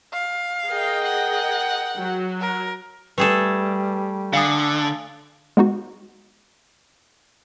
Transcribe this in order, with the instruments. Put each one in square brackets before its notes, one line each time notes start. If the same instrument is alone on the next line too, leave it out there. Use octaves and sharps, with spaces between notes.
[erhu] F5
[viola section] G#4 D#5 [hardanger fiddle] A#4 G5
[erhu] F#5
[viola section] F#3 F#4
[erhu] A#4
[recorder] G3 [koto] A3 G#4 A4 [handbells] B4
[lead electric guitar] D3 [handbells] F5 G#5 D#6
[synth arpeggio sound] G#3 B3 D#4 F#4